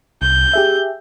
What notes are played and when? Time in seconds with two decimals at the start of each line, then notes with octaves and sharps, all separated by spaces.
0.22 C2 G6
0.53 G4 G#4 E5